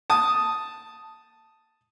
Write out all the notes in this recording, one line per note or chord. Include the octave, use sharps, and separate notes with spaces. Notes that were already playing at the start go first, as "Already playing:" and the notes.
A5 D#6